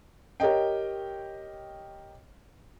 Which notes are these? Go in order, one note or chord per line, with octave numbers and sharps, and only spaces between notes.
G4 A#4 C#5 D#5 G5